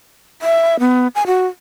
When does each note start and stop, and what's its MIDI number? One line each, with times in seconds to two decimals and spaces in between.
0.42 0.76 76
0.80 1.07 59
1.15 1.23 80
1.27 1.47 66